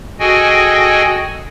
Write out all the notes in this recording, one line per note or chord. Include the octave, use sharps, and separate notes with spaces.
F#4 G#4 A4 D#5 G5 G#5